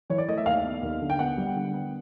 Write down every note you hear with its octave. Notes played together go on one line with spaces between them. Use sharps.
E3 C#5
D5
A3 D#5
E5
D#2 F5
B3
D#2
D3
G5
B3 F#5
G3
D3
B3